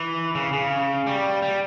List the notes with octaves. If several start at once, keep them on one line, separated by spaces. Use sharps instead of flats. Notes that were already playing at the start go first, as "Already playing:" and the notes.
Already playing: E3
C#3
C#3
G3
G3